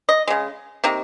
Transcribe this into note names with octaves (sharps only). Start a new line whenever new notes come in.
D#5
C#3 G#3
C3 D#3 A#3